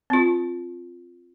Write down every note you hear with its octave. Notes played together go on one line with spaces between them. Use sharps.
C4 F4